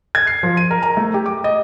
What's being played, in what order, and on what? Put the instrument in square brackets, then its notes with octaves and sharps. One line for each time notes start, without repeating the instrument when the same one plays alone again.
[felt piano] G#6
C7
F3
D#7
A#4
A#5
A3
G4
D6
D#5